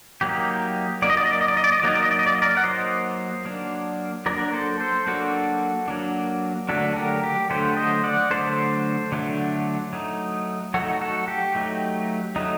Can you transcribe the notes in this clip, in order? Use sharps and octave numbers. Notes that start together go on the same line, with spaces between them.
F#3 A#3 D#4 G4
F#3 A#3 D#4 D5
D#5
D5
D#5
D5
D#5
D5
D#5
D5
D#5
D5
F#3 A#3 D#4 D#5
D5
D#5
D5
D#5
D5
D#5
A#4 D5
F#5
F#3 A#3 D#4 C5 D#5
F#3 A#3 D4
F#3 A#3 D4 A#4 D5
A4 C5
A4 C5
F#3 A#3 D4 F#4 A4
F#3 A#3 D4
D3 F#3 A3 D4 F#4 A4
G4 A#4
G4
D3 F#3 A3 D4 A4 C5
C5 D#5
D5 F#5
D3 F#3 A3 D4 A4 C5
D3 F#3 A3 D4
F#3 A3 D#4
F#3 A3 D#4 F#4 A4
F#4 A4
G4
F#3 A3 D#4
F#3 A3 D#4